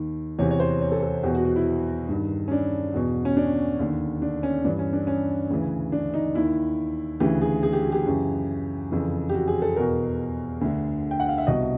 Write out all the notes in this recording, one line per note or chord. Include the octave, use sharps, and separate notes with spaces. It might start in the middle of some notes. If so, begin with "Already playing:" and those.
Already playing: D#2 D#3
E2 C3 E3 C#5
C#5
C5
C#5
A4
A4
E2 B2 G4
F#4
F#4
E4
G2 D#3
C#4
D4
E2 B2
C#4
D4
D#2 D3
D4
C#4
G2 E3 D4
C#4
D4
C#4
D2 C#3 E3
D4
D#4
D#2 D#3 E4
D2 C#3 E3 G4
G#4
G#4
G4
F#4
G4
F#2 C#3 E3
F2 C#3 E3
G4
F#4
G#4
A4
E2 B2 A#4
D2 D3
G5
F#5
F5
E5
C2 B2 D#5